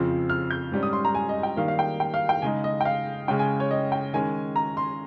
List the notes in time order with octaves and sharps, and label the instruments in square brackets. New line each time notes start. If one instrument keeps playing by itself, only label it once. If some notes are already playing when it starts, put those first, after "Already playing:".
Already playing: [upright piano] F2 C#3 F3 C4
F6
G6
G#2 G3 C#4
D#6
C6
A#5
G#5
D#5
G5
D#3 G3 A#3 F5
F5
G5
G5
F5
G5
C#3 G#3 D#4 G#5
D#5
G5
F5
C#3 G#3 C#4 G5
G#5
C#5
D#5
G5
D#3 G#3 C#4 G#5
A#5
C6